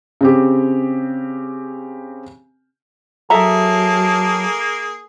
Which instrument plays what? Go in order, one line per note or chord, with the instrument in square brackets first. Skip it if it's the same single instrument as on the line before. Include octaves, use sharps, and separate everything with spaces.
[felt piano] C#3 C4 G4
[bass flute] F#3 [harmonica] A#3 G#4 [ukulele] A4 E5 A#5 [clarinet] A5